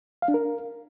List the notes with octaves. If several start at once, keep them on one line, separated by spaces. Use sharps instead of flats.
F5
D4
A#4